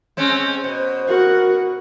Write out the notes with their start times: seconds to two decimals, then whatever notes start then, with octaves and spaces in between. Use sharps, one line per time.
0.17 G#3 C4 C#4
0.64 B2 C5
1.08 F#4 A#4